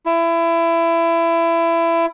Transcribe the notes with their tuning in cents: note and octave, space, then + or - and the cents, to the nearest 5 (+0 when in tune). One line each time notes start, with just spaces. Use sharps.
E4 +25